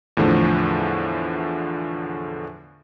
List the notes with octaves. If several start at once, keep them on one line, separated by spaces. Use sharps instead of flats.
E2 A2 D3 F3 A3